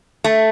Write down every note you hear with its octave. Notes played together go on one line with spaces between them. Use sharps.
A3